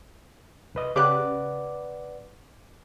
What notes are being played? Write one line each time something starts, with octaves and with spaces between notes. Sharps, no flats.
C2 B4 D#5
C#3 G4 B4 D5 F#5 D6 F#6